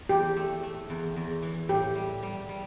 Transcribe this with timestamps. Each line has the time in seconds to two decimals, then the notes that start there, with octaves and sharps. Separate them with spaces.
0.09 E2 G4
0.37 A3
0.63 A3
0.90 E2
1.16 E2
1.43 E3
1.69 A2 G4
1.95 G3
2.23 G3
2.49 G3